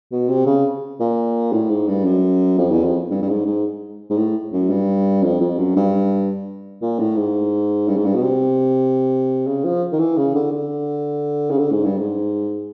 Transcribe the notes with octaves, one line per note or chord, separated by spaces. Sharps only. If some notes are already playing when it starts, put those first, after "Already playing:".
B2
C3
C#3
A#2
A2
G#2
G2
F#2
F2
E2
F2
G2
G2
G#2
G#2
G#2
A2
F#2
G2
F2
F2
F#2
G2
A#2
A2
G#2
G2
G#2
G2
B2
C3
C#3
F3
D#3
E3
C#3
D3
D3
C#3
D3
G#2
G2
G#2